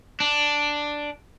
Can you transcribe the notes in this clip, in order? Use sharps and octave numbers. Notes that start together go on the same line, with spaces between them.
D4